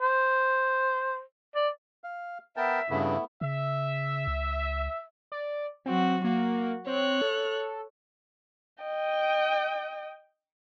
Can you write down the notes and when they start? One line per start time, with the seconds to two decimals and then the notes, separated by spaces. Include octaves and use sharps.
0.01 C5
1.55 D5
2.04 F5
2.57 B3 A#4 E5 G5 A5
2.90 G2 C#3 A3 B3 E4
3.41 C#3 E5
4.27 C#2
5.32 D5
5.86 F#3 C4 F#4
6.24 A#3 F#4
6.87 C4 C#5 F#6
7.22 A4
8.84 D#5 G5